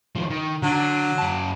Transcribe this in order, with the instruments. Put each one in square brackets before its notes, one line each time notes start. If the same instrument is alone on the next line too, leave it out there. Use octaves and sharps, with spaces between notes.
[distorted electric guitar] D#3 F3
D#3
[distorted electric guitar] D3 [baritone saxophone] F#3
[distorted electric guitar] F#2 A5